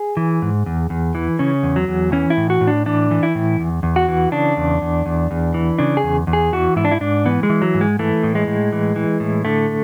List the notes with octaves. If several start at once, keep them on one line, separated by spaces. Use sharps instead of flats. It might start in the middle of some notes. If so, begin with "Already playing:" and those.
Already playing: G#4
E3
G#2
E2
E2
E3
C#3 C#4
E2
F#3
E2
E3 C#4
E4
A2
F#4
A2
D4
E3 D4
E3
E4
A2
E2
E2
F#4
E3
C#3 D4
E2
E2
E2
E2
E3
C#3 D4
G#4
E2
E2
G#4
E3 F#4
G#2 E4
D4
E4
G#2 D4
E3 B3
G#3
E3
F#3
G#2
G#3
E3 A3
A2
G#3
A2
E3
E3
A2
D3 A3